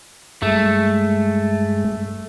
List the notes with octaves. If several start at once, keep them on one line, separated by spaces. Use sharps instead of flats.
G2 G#3 A3